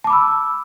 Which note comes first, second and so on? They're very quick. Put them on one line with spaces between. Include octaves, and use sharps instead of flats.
A5 D6 B5 E6